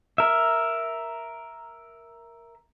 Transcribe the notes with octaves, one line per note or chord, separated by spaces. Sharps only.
A#4 E5